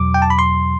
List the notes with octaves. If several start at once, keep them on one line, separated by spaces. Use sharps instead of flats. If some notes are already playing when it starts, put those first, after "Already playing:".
Already playing: E2 B2 F#3 D6
G5
A5
B5
C6